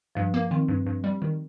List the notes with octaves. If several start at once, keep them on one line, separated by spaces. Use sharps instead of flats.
G2 F3
A#3
D#3 C4
G2
G2
G3
D#3